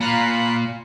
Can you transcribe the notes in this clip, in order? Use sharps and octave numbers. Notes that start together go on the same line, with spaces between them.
A#2 F5 A#5 B5 F#6